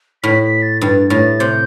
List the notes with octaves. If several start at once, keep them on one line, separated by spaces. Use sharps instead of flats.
A2 B6
B6
A6
G2 A6
A2 A6
C3 G6